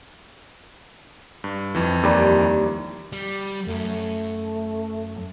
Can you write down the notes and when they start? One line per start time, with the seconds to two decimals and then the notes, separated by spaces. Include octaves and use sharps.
1.44 G2
1.75 F2 E3
2.04 D#2 G3
3.12 G3
3.68 F#2 A3